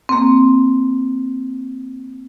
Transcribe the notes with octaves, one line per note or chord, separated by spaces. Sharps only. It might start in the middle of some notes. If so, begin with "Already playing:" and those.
A#3 C4